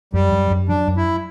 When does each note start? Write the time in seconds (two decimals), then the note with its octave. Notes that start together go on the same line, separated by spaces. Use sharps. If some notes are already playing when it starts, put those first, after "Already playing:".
0.13 F#2 G3
0.32 F#2
0.50 F#2
0.69 F#3 D4
0.87 F#2
0.97 E4